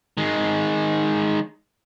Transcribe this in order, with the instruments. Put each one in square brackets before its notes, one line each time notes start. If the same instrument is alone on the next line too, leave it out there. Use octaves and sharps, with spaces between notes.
[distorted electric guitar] D#3 G#3